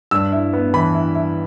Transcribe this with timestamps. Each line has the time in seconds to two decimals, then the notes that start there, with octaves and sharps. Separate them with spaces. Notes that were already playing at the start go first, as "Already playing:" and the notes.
0.11 G2 E6
0.32 E4
0.53 B3
0.74 E3 B5
0.94 E4
1.15 E4